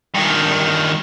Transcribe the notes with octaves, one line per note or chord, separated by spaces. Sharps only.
G2 D#3